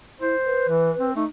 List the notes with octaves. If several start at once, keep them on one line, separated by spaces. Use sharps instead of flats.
E4 C5
B4
E3
C4
A3 D#4